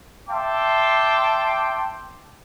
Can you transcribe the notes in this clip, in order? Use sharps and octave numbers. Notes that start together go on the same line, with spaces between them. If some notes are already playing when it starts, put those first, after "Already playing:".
E5 G5 A5 C6 D6